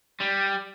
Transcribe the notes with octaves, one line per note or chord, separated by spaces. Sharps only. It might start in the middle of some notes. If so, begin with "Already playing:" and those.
G3